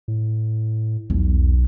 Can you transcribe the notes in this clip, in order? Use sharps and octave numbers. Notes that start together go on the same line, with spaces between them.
A2
B1 E2